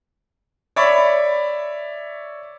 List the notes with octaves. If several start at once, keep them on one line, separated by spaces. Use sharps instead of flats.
C#5 D5 E5 B5 C#6